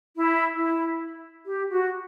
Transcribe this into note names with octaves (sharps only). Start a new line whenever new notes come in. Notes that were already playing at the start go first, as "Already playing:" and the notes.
E4
E4
G4
F#4